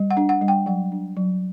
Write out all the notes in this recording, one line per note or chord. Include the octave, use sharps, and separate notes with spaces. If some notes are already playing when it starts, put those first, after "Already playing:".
Already playing: G3
F#5
D4
F#5
G3
G5
F#3 F#5
D4
F#3